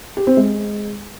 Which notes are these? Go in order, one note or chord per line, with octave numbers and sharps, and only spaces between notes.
G4
C4
G#3